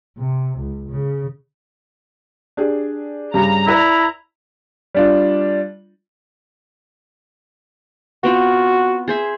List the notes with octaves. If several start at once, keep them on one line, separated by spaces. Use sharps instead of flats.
C3
C#2
C#3
D4 G4 G#4
G2 C#3 G3 A#5
E4 B4 D5
G3 D4 F4
B3 C4 F4 F#4
G#4 C5 E5